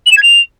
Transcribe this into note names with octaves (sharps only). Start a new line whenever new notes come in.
F#7
E7
G#6
F7